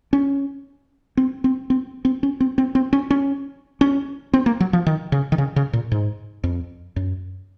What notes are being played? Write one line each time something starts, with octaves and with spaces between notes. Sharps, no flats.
C#4
C4
C4
C4
C4
C#4
C4
C4
C4
C#4
C#4
C#4
C4
A#3
F#3
F3
D#3
C#3
D#3
C#3
C#3
A#2
G#2
F2
F#2